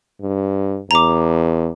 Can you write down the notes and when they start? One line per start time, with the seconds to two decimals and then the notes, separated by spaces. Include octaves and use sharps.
0.22 G2
0.91 E2 A#5 D6